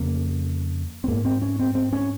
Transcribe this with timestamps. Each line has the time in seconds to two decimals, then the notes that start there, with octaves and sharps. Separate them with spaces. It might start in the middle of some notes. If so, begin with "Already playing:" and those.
Already playing: F2 C#3 A#3
1.04 C4
1.08 G#2 A#3
1.25 C4
1.42 C#4
1.59 C4
1.75 C4
1.93 C#4